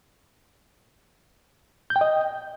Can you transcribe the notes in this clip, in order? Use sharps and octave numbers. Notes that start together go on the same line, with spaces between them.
G6
G5
D#5